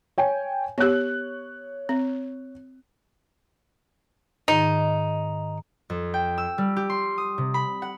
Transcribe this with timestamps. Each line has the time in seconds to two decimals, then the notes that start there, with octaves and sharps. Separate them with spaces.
0.18 C#5 G5 G#5
0.78 B3 G4 C#5 F#6
1.89 C4
4.48 G#2 D#3 D#4
5.90 F2
6.14 G5
6.38 E6
6.58 G3
6.76 G4
6.90 C6
7.18 D#6
7.38 C3
7.54 B5
7.82 F#5